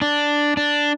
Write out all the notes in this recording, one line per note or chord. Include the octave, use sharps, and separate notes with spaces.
D4
D4